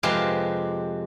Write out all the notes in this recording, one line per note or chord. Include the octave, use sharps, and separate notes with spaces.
F2 C3 G#3 G4 B4 F5